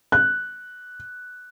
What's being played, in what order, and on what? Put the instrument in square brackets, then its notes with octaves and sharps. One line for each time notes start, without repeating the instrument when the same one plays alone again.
[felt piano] F#6